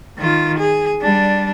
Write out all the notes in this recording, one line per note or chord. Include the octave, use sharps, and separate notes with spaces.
D#3 F4
G#4
G3 D4